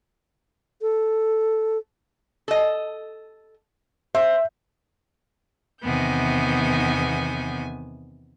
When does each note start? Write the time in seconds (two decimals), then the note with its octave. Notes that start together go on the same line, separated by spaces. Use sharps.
0.82 A4
2.48 A4 D#5
4.15 C5 E5
5.84 E2 C3 D#3 B3 G#5 G6